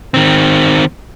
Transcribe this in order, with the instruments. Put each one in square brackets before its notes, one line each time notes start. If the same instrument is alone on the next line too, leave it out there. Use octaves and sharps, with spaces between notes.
[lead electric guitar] D#3 C4